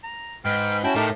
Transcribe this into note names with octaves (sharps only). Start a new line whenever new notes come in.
A#5
G#2 B4 G5 F6
C#4 E4 F#4 G5 A5
A2 A3 D#4 G4 A#4